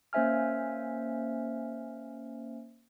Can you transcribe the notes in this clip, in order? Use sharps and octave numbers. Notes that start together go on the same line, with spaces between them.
A#3 C#4 C5 E5 G#5 F6